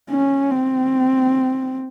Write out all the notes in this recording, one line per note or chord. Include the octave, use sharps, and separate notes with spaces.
C#4
C4